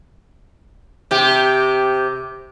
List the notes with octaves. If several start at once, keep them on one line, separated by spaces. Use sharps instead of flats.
C3 G4